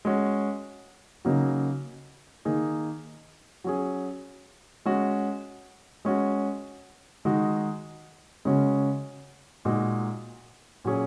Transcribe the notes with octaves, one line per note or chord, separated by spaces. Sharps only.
G#3 C#4 F#4
C#3 F#3 A#3 D#4
D#3 A#3 D#4 G#4
F#3 C#4 G#4
G#3 C#4 F#4
G#3 C#4 F#4
D#3 G#3 D#4 F#4
C#3 G#3 C#4 F#4
A#2 G#3 D#4 F#4
A#2 F#3 C#4 G#4